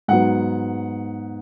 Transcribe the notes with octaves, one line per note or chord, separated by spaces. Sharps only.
G#2 F#3 B3 F#5